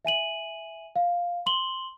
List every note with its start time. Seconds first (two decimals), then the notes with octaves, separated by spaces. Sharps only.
0.05 E5 G#5 D#7 F#7
0.96 F5
1.46 C6 F#7 G7